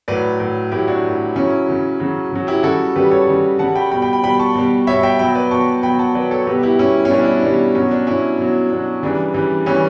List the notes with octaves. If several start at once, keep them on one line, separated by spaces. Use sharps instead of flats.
A2 F#3 B4 D5
A2 F#3
A2 F#3 E4 G4
D4 F#4
A2 F#3
C#3 F#3 C#4 E4
C#3 F#3
C#3 F#3
C#3 F#3
E4 G4
C#3 G3 F#4 A4
C#3 G3 G4 B4
A4 C#5
C#3 G3
C#3 G3 F#5 A5
G5 B5
B2 G3 G5 B5
G5 B5
G5 B5
B2 G3 G5 B5
A5 C#6
B2 G3
B2 G3 C#5 E5
E5 G5
B2 F#3 G5 B5
B4 D5
B2 F#3 A5 C#6
B2 F#3 G5 B5
F#5 A5
B2 F#3 B4 D5
A4 C#5
B2 G3 G4 B4
E4 G4
B2 G3 C#4 E4
C#4
B2 G3 D4
E4
D4
B2 G3 D4
B2 F#3 C#4
D4
B2 F#3 C#4 E4
B2 F#3
B2 F#3 D4
C#3 E3 G3 D4
C#3 E3 G3
C#3 E3 G3 C#4